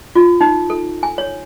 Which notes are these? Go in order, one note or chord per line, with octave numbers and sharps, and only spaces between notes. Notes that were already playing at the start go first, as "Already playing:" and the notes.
F4
D#4
A4
G#5
C#5